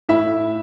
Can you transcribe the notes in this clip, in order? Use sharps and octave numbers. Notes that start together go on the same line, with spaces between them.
A2 E4 E5